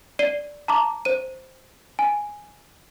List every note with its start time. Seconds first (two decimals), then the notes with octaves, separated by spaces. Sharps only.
0.19 D5 C7 D#7 G7
0.68 A5 A#5 D6
1.05 C5 D#7
1.99 G#5